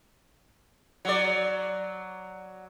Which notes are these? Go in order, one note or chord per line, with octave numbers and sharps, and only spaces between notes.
F#3 D5